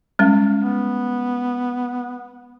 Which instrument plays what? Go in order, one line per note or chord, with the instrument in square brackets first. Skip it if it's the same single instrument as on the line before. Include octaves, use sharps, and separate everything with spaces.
[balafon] G3 G#3 C#4
[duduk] B3